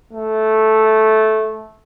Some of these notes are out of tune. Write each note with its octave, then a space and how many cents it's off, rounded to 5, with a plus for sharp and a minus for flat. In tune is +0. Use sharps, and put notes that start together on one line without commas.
A3 -10